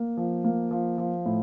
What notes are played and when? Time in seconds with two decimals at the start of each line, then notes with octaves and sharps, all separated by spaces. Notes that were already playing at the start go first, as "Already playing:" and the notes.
Already playing: A#3
0.17 F3
0.44 A#3
0.71 F3
0.98 F3
1.26 A2